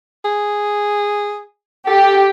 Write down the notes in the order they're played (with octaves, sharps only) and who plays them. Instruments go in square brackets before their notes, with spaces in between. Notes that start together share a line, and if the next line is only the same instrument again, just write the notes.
[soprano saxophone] G#4
[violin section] G4 [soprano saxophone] A4